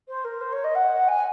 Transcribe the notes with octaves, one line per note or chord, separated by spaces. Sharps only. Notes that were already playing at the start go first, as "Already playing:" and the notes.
C5
A#4
C5
C#5
D#5
F#5
G#5